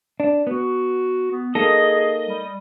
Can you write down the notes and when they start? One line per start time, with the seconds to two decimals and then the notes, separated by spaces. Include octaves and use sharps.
0.20 D4
0.47 B3 F#4
1.31 B3
1.55 A#3 D#4 G#4 A4 D#5
2.27 G3